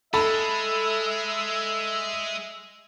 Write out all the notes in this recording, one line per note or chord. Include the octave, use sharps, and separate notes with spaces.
G#3 A4 E5 B5